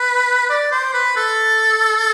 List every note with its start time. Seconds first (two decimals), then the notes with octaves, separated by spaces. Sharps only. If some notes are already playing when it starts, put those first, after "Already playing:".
Already playing: B4
0.49 D5
0.71 C5
0.94 B4
1.16 A4